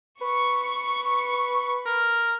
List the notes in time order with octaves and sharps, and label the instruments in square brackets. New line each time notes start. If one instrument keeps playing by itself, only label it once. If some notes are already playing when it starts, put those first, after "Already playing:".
[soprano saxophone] B4 [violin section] C#6
[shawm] A#4